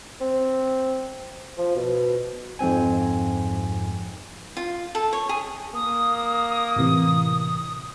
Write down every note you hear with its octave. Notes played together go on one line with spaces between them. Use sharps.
C4
F3
B2
F2 G#2 C4 G#5
F4
A4
C#5
G#4
A#3 D#6
A2 C3 E3